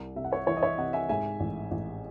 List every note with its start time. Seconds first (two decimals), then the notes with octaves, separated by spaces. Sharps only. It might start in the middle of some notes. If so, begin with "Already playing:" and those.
Already playing: C2
0.16 C3 E5
0.24 F#5
0.31 C#5 E5
0.46 E3 C#5 E5
0.57 D#5
0.62 C#5 E5
0.78 C3 D#5 F#5
0.93 E5 G#5
1.09 G#2 E5 G#5
1.40 A1
1.71 A1